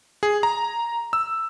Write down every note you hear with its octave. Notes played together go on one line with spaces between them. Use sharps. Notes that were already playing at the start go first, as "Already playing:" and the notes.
G#4
A#5
E6